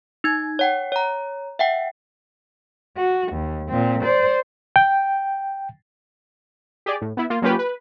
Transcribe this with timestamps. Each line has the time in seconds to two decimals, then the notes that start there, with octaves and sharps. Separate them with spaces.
0.24 D#4 G#6
0.59 C#5 F#5 G5
0.92 C#5 A#5
1.59 E5 F#5 G5
2.97 F#4
3.33 D#2
3.69 A#2 C4
4.04 C5 D5
4.76 G5
6.86 G4 G#4 D5
7.01 A2
7.17 B3 E4
7.30 A#3 F4
7.42 F#3 A#3 C#4 F4 G4 B4
7.59 B4